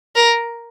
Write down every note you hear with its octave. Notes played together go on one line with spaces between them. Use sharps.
A#4